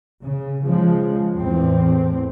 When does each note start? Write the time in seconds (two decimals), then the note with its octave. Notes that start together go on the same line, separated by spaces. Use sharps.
0.22 C#3
0.64 C#3 F3 G#3
1.38 E2 A2 E3 C4